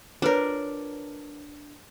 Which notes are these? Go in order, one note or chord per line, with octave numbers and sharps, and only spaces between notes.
D4 F4 A#4 B4 C#5